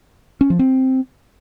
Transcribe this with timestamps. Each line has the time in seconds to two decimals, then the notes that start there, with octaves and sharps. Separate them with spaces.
0.41 C#4
0.50 F3
0.59 C4